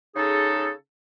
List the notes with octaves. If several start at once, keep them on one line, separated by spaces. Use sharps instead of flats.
C#3 D#4 G#4 A4